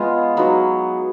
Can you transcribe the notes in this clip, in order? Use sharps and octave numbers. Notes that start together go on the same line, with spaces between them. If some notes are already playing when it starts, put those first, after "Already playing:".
Already playing: G#3 B3 F4 G#4
F#3 B3 D#4